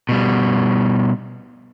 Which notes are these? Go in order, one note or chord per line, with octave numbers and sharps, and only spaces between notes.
B2 G3